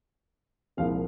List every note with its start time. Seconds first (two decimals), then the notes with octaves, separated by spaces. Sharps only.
0.77 C2 A#2 F3 G#3 C4 F5